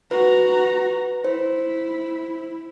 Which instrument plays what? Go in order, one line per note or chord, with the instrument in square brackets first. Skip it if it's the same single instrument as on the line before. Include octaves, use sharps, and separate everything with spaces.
[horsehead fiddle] F#4 A#5 [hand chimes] B4
[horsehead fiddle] E4 [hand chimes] C5